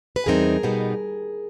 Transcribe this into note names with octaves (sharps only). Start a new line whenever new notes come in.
B4
E2 B2 G3 C4 D#4 G#4 A#4
B2 G3 B3 D#4